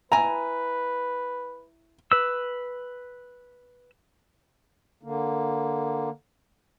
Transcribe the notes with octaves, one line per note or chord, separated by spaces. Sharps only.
E4 B4 G#5 A#5
B4 E6
D3 A#3